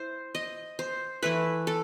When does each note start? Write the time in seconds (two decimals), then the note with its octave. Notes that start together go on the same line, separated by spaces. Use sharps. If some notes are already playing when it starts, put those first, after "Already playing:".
Already playing: E4 C5
0.35 D#5
0.79 C5
1.23 E3 A3 E4 B4
1.67 A4